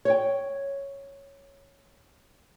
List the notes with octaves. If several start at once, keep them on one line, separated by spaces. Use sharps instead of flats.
C#5 G5